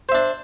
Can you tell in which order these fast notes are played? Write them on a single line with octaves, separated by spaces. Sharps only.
C5 E5 D4